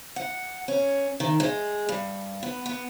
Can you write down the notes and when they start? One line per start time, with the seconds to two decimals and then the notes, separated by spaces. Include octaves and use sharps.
0.16 F#5
0.68 C#4
1.20 D#3
1.40 G#3
1.89 G2
2.43 B3
2.66 B3